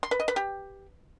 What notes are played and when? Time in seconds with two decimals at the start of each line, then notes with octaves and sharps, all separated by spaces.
0.03 C6
0.11 B4
0.20 D#5
0.28 B4
0.36 G4